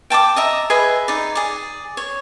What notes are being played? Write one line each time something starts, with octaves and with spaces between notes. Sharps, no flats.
G5 A5 C#6 D6
D#5 E5 A#5
G#4 B4 D#5 E5
D#4 D5
G#4 D5
C#5